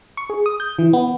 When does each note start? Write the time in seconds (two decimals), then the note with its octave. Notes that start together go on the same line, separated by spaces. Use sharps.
0.17 C#6
0.30 G#4
0.46 D#6
0.60 G6
0.79 E3
0.93 B3